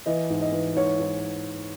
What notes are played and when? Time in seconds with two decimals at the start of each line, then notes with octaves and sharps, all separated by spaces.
0.06 E3 D#5
0.30 G#2
0.41 D#5
0.52 E3
0.76 G#2 C#5
1.00 G#2